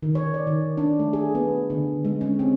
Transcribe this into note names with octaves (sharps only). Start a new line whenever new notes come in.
D#3
C#5
D5
D#3
D4
A3
G#4
B3
D3
G#3
C#4
C4